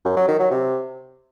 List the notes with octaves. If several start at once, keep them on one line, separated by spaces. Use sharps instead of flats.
F#2
F#3
D#3
F#3
C3